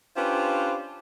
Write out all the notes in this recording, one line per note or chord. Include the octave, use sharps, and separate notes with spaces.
C#4 D4 F4 G4 B4 C5